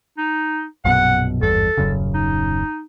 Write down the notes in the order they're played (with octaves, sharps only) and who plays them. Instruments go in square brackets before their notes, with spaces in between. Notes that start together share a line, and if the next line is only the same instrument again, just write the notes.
[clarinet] D#4
[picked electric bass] A#1 F#2 B2 [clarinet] F#5
[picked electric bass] G#1 E2 G2 [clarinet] A4
[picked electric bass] D#1 F#2 C#3
[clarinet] D#4